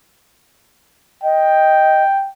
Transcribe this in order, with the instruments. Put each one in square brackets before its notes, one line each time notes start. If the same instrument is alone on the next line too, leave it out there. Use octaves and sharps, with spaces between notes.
[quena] D#5 [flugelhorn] G5